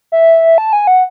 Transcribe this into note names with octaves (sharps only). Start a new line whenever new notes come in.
E5
A5
G#5
F#5